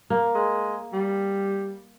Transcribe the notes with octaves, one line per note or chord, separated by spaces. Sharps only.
A#3
G#3
G3